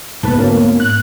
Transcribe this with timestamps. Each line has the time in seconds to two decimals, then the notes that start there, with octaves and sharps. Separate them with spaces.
0.23 G#2 B3 B4 A5
0.38 D2 A#3 C#4
0.80 F#6